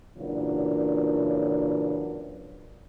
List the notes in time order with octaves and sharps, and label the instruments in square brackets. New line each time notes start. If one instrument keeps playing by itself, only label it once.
[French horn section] A#2 C#3 E3 F#3 D4 A#4